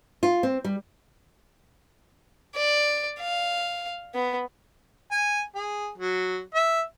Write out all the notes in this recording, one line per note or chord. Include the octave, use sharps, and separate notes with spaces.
F4
C4
G3
D5
F5
B3
G#5
G#4
F#3
E5